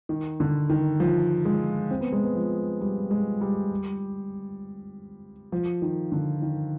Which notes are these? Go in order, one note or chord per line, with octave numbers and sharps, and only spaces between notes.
D#3
D3
D#3
F3
G#3
C4
B3
G#3
B3
F3
G3
G#3
G3
F3
D#3
D3
D#3